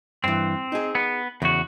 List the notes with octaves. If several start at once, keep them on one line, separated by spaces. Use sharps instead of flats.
G2 E3 C4
D#4 G#4
B3
E2 C#3 F#4